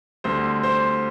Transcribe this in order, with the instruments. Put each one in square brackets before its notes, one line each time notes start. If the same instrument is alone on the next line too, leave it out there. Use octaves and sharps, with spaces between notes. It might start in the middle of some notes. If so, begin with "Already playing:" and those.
[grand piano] D2 D3 G3 C4 C5
C5